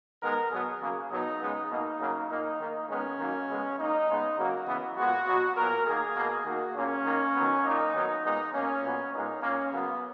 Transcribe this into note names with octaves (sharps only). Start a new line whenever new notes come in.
D#3 G#3 B3 A#4
B2 F#3 B3 G#4
C#3 F#3 A#3
B2 F#3 B3 D#4
C#3 G#3 B3
B2 A#3 D#4
C#3 F#3 A#3
A#2 A#3 D#4
D#3 A#3
D#3 G#3 B3 C#4
D#3 F#3 A#3
C#3 G#3 B3
D#3 A#3 D#4
C#3 G#3 B3
C#3 F#3 A#3 F#4
C#3 E3 B3
A#2 G#3 B3 F#4
B2 F#3 B3
A#2 F#3 B3 A#4
D#3 A#3 G#4
B2 A#3
D#3 A#3 F#4
A#2 A#3 C#4
D#3 A#3
D#3 F#3 B3
A#2 A#3 D#4
D#3 F#3 B3
A#2 G#3 B3 D#4
B2 A#3 C#4
A#2 F#3 B3
A#2 G#3 B3 D#4
A#2 A#3 C#4
C#3 F#3 A#3 B3